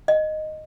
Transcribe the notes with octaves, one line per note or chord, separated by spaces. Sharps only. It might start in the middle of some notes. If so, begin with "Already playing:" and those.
D#5